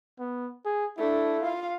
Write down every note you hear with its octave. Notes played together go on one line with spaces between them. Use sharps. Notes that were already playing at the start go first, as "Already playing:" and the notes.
B3
G#4
A3 D4 E4
F4 F5